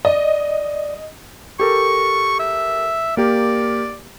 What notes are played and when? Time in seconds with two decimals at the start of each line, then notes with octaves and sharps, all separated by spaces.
0.05 D5 D#5
1.60 G4 A4 A#4 C#6
2.40 E5
3.17 A#3 G4 A#4 D5